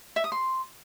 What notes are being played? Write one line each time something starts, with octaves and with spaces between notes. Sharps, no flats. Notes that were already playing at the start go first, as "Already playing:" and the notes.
E5
D#6
C6